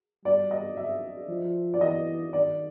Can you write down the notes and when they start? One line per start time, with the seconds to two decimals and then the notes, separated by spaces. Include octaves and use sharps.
0.25 G3 D5
0.51 D#5
0.77 E5
1.28 F3
1.74 D5
1.80 E3 D#5
2.33 D#3 D5